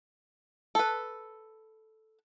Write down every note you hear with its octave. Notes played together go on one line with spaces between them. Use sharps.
A4 B4